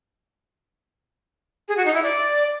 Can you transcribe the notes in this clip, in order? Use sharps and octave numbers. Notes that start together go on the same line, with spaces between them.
G#4
F#4
D#4
E4
D5